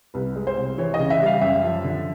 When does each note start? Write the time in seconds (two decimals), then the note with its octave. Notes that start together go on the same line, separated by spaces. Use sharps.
0.14 C2 B4
0.36 G#3
0.47 C5
0.57 C2
0.78 E3 C#5
0.94 D#5
0.99 C#3
1.10 E5
1.21 G3
1.26 F5
1.41 F#2 E5
1.63 F3
1.84 D3